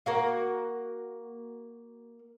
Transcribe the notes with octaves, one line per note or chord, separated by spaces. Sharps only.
A#3 F#4 F5